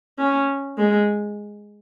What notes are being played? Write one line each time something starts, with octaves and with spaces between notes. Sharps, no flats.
C#4
G#3